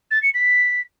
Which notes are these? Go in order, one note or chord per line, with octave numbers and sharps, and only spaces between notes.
A6
C#7
B6